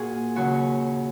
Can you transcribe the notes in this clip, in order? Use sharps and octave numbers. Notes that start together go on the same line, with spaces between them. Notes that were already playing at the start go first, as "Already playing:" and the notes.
Already playing: A#2 F#4 G#4
D#2 C#3 F#3 F#4